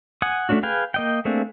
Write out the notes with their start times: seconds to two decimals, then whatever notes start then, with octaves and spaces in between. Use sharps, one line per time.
0.22 F#5 G#5 D#6
0.49 A3 A#3 C#4 D4 F#4
0.63 G#4 B4 F5 G5 G#5
0.94 A#3 D#5 G5
1.25 A3 A#3 C4 D4 G#4